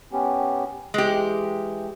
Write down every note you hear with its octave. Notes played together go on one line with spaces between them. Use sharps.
B3 C#4 G4
E3 G#3 G4